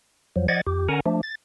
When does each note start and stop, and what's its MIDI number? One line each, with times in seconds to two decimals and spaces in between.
0.36 0.47 41
0.36 0.47 53
0.36 0.47 54
0.48 0.61 53
0.48 0.61 74
0.48 0.61 75
0.48 0.61 78
0.48 0.61 92
0.48 0.61 93
0.67 0.88 41
0.67 0.88 67
0.89 1.00 50
0.89 1.00 61
0.89 1.00 70
0.89 1.00 78
0.89 1.00 80
0.89 1.00 82
1.06 1.21 53
1.06 1.21 57
1.06 1.21 62
1.23 1.35 93